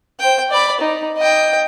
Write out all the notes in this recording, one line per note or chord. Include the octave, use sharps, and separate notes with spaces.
C5 G5
D5 B5
D#4
D#5 G5